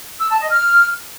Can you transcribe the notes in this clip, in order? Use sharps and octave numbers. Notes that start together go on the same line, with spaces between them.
E6
A5
D#5
F6